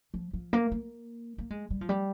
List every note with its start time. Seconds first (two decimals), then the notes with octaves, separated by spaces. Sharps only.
0.14 F3
0.33 F3
0.53 A#3
0.72 A#3
1.38 A#3
1.50 G#3
1.70 G3
1.81 F3
1.89 G3